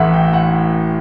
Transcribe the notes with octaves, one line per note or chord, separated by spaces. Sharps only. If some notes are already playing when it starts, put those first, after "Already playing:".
Already playing: A1 A2 E3 E5 F#5
G5
F#5